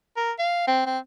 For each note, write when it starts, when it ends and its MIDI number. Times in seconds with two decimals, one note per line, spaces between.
0.17 0.32 70
0.39 0.63 77
0.68 0.82 60
0.86 0.99 60